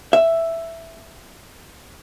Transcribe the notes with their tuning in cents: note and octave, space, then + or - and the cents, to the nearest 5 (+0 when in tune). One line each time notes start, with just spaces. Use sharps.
E5 +5